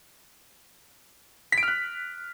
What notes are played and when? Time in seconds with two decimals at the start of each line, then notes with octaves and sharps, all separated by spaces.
1.52 B6
1.58 D7
1.63 F6
1.68 F#6